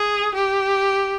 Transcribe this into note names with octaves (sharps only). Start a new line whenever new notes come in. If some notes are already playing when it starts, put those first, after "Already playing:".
Already playing: G#4
G4